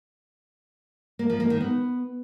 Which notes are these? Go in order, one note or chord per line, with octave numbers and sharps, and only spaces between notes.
A#3
F3
A#3
D#3
B3